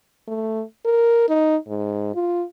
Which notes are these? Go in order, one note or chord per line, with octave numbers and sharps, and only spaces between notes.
A3
A#4
D#4
G#2
F4